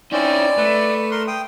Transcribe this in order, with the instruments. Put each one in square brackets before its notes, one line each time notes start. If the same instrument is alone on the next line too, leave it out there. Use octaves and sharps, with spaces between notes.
[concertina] C4 C#4 [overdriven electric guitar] D#4 E4 [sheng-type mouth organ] D5
[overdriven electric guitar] A3 [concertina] B4
[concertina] A#4 C6
G5 D#6